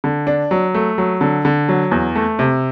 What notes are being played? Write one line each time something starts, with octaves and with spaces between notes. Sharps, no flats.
D3
D4
F#3
A3
F#3
D3
D3
F#3
E2
A3
C3